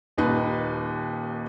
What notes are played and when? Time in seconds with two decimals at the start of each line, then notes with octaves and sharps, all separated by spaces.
0.17 D#1 D#2 D#4 B4